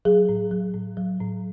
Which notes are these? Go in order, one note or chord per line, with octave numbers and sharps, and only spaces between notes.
F#3 G#4
A2
F#3
A2
F#3
A2